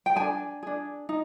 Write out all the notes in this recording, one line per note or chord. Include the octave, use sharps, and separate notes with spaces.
G5
D4 G#4 G#5
D4 G#4
D#4